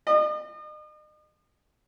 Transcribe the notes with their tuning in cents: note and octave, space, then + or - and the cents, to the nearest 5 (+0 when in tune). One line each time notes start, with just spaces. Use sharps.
D#5 -40